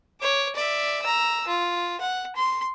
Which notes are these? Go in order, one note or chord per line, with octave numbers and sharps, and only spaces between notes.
C#5 D6
D5 E5
A#5 E6
F4
F#5
C6